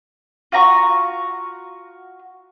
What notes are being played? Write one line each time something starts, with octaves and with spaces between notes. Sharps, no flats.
F4 F#4 A#5 C#6